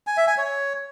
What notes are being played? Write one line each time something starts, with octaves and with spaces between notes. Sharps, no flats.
G#5
E5
G#5
C#5